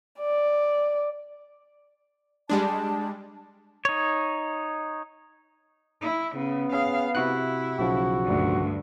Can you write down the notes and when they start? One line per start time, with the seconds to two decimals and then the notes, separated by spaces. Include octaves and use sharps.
0.20 D5
2.49 G3 G#3 D4 A5
3.85 D#4 C#5
6.01 E4
6.36 C#3 B3
6.73 C#4 G#4 F5
7.15 C3 E4 F#4 F#6
7.79 B1 C#3 F3 F#4
8.24 D2 G2